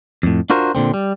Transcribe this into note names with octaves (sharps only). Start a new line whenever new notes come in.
F2 A2
D4 F4 F#4 A#4 C5
A#2 D3 C4
G3